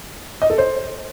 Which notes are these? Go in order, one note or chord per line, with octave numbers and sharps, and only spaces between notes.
D#5
A4
C5